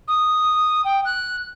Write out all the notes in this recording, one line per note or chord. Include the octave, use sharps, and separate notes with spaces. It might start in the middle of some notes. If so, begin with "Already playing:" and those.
D#6
G5
F#6